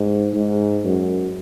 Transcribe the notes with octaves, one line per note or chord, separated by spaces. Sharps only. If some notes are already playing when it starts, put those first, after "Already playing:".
Already playing: G#2
G#2
F#2